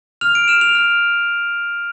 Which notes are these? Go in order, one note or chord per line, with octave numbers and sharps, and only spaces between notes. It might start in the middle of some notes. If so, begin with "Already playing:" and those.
F6 F7
D7
F6 E7
F7
F6